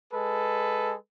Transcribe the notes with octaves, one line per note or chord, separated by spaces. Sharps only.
G#3 A4 B4